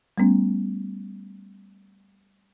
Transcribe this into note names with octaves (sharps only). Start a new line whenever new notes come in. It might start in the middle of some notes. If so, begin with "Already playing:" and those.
G3 A3 B3 C#4